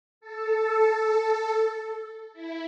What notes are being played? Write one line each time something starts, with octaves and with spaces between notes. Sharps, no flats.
A4
E4